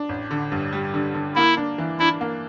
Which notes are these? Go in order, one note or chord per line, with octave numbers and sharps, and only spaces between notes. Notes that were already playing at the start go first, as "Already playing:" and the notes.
Already playing: D4
A1
D3
G2
G3
D3
D3
A#3 E4
D4
E3
D4 E4
A#3